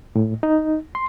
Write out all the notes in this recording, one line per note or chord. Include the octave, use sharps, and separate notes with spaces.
A2
D#4
C6